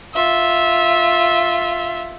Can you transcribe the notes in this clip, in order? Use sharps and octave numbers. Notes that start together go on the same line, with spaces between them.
F4 E5